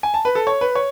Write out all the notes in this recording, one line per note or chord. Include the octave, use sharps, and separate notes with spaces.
G#5
A5
B4
A4
C#5
B4
C#5